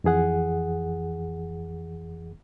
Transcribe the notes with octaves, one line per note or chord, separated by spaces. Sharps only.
F2 E3 G#4 F#5